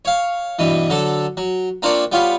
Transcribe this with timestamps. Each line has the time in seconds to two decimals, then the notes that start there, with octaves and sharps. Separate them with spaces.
0.05 C#5 F5
0.59 G2 B2 E3
0.90 D3 F#3 A4 A5
1.37 F#3
1.82 A#3 C4 D4 F4 C#5 D5
2.12 G3 B3 F4 C#5 F5